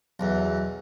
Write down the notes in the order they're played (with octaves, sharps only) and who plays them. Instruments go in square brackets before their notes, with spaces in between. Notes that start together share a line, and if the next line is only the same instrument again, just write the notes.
[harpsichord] B1 E2